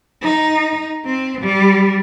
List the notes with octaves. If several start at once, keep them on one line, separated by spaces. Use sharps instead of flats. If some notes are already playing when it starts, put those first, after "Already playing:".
D#4
C4
G3